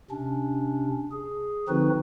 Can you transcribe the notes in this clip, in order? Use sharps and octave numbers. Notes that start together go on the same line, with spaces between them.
C3 C#4 D4
G#4
D3 F3 C4 D#4 F#4 B4